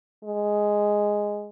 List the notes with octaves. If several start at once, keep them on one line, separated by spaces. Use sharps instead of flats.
G#3